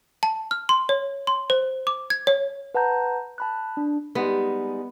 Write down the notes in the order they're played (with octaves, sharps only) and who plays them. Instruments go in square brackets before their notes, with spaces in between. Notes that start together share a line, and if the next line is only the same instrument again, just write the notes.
[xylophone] A5
F6
C6
C#5
C6
C5
D6
G#6
C#5
[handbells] B4 F#5 A5 A#5 G6
A5 B5 F#6
D4
[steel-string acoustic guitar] G3 G#3 D#4 [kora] B3 [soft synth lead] G4